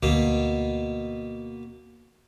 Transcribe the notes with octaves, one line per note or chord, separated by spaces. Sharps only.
D2 B2 A#3